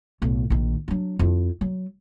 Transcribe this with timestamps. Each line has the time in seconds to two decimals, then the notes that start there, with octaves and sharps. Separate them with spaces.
0.22 B1 A2
0.50 A#1 D#3
0.88 F#3 D4
1.19 F2 E4
1.61 F#3